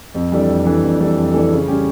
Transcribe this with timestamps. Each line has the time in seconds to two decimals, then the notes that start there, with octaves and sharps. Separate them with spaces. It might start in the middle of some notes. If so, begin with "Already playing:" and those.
0.15 F2
0.32 E3 G3 D4 A4
0.49 F2
0.66 E3 G3 D4 A4
0.83 F2
1.00 E3 G3 D4 A4
1.17 F2
1.34 E3 G3 D4 A4
1.52 C#3
1.68 G3 C#4 G4